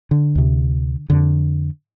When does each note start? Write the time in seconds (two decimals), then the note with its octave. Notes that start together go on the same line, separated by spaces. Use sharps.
0.11 D3
0.35 D2 C3
1.10 F2 D3